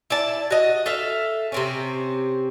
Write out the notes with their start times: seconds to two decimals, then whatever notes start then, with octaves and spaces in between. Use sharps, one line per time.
0.10 E4 D5 A5
0.51 F#4 D#5
0.86 A4 E5 F5
1.52 C3 C4 C#4